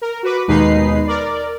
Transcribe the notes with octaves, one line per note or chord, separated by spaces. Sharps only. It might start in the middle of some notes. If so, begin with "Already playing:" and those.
A#4
F#4 B4 D6
D#2 B2 G#3 D#4 B4 C7
A#4 D5